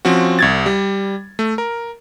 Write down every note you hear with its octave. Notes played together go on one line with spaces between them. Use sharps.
F3 C4 C#4 F#4
C2 G#6 A6
G3
A3
A#4